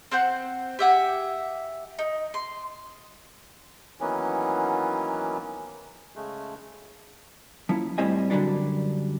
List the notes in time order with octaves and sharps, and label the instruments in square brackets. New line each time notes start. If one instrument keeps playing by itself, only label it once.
[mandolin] C4 C5 F#5 G6
G4 E5 F#5 G#5
D#4
C6
[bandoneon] D#3 E3 F#3 A#3 B3 C#4
C#3 G#3 A3
[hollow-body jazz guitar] F3 A#3 C#4 E4
A2 G3 C4 C5 D#5 G#5
F#2 D3 D#3 F#3 G3 D4